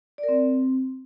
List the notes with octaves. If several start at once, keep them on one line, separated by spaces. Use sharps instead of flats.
D5
A#4
C4